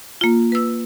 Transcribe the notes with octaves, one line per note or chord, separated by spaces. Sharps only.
A#3 F4
B4 E6